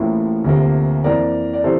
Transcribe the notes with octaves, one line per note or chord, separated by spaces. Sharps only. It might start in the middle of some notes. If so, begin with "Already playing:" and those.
Already playing: A1 A2 F3 A#3
D2 C3 F3 A#3
F2 E3 A#3 A#4 D5
D5
C3 E3 A#3 A4 C5